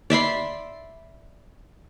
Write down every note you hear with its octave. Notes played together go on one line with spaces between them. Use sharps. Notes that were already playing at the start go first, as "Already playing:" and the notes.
D5 E5 B5 C6